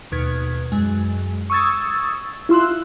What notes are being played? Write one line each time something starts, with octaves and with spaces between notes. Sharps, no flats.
D#2 B2 G#6
F#2 G#3
C#6 D#6 E6 G#6 A6
E4 F4 C6 E6 F#6